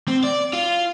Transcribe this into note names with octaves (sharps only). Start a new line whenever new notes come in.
C4
D5
F4